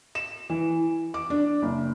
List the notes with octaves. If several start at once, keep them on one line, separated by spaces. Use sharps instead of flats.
E7
E3
D6
D4
F#1